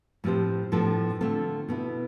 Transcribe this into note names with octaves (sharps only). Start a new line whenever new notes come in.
A2 F3 C4 G4 C5
A2 F3 B3 D4 A4
D3 A3 C4 F4 A4
B2 B3 E4